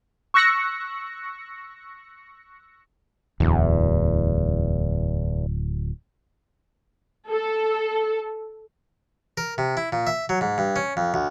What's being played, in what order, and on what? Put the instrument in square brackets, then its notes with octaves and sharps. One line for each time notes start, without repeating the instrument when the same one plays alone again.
[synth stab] C#6 E6 F#6 A#6 C#7
[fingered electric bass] D1 [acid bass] E2
[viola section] A4
[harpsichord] A#4
C3
E4
A#2
E5
F#3
G#2
G2
C#4
F2
D2